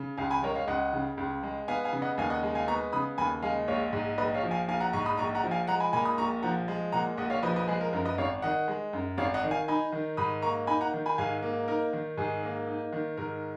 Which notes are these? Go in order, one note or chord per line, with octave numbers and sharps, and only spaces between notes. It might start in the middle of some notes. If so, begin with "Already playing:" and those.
Already playing: C#3
C#2 F5 G#5
G#5 B5
G#3 A#4 C#5
C#5 F5
C#2 D#5 F#5
C#3
C#2
G#3
B3 F5 G#5
F5 G#5
C#3
D#5 F#5
D#2 F5 G#5
D#5 F#5
G#3
F5 G#5
B3 A#5 C#6
C#3 B5 D#6
D#2 G#5 B5
G#3 F5 G#5
A#1 C#5 F5
G#2
A#1 B4 D#5
C#5 F5
F3
F5 G#5
A#1 F5 G#5
F#5 A#5
G#2 A#5 C#6
B5 D#6
A#1 A#5 C#6
F#5 A#5
F3
F5 G#5
G#3 F#5 A#5
G#5 B5
A#2 G#5 B5
B5 D#6
A#1 A#5 C#6
F3 F#5 A#5
G#3
A#2 F#5 A#5
A#1 D#5 F#5
C#5 F5
F3 B4 D#5
B4 D#5
G#3 G#4 B4
A#4
F#2 A#4
B4 D#5
G#1 C#5 F5
D#3 D#5 F#5
G#3
F#2
G#1 C#5 F5
D#5 F#5
D#3
F5 G#5
D#4 G#5 B5
D#3
G#2 B5 D#6
A#3 A#5 C#6
D#4 G#5 B5
F#5 A#5
D#3
G#5 B5
G#2 F5 G#5
A#3
D#4 A#4
D#3
G#2 G#4
A#3
D#4
D#3
G#2 A#4